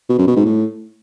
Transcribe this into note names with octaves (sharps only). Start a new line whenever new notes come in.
B2
F#2
B2
G#2
A2